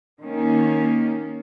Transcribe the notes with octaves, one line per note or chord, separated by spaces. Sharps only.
D#3 A#3 C#4